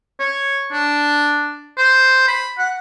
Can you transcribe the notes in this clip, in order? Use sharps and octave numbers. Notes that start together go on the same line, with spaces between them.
C#5
D4
C5
B5
F#5